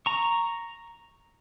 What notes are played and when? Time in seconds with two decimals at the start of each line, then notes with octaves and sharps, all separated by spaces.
0.06 A#5 C#6